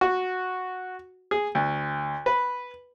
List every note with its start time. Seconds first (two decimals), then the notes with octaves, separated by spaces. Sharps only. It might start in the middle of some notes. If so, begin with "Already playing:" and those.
0.01 F#4
1.31 G#4
1.55 D2
2.26 B4